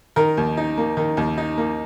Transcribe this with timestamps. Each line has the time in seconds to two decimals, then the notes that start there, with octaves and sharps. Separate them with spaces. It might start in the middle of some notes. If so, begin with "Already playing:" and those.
0.16 D#3 A#4
0.37 D#2
0.57 D#4
0.77 A#3
0.97 D#3
1.17 D#2
1.38 D#4
1.58 A#3